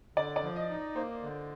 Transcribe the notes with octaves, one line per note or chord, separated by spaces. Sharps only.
D3 D5
D5
F3
D#5
D#4
A#3 C5
D3